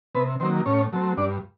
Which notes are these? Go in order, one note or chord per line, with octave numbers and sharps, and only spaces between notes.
C3 B3 B4
D#3 F#3 A#3 C4 C5
A2 C#4 C#5
F#3 A3 C4
G2 D4 D5